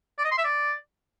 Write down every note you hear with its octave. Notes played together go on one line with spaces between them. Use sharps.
D5
D#5
C6
E5
D5